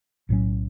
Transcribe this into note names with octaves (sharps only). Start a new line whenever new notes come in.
B1 A2 F#3 C#4